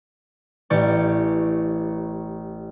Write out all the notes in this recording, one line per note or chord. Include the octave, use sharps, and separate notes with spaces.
A1 G4 D5 C#6